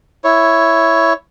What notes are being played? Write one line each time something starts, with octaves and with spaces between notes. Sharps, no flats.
E4 C#5